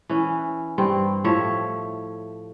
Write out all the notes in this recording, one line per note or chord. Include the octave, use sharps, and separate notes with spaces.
E3 C#4
G2 C4
A2 F3 C#5 E5